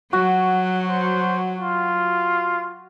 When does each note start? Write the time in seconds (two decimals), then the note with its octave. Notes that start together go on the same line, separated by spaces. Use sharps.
0.13 F#3 F#4
0.88 C5
1.59 F4